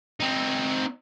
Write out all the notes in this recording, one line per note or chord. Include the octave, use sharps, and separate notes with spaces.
C4 D#4